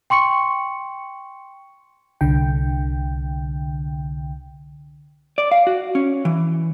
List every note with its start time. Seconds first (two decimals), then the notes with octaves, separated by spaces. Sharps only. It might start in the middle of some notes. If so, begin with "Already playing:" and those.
0.10 G5 C6 C#6 C#7
2.21 C2 D3 G5
5.38 D5
5.52 F5
5.67 F#4
5.95 C#4
6.25 E3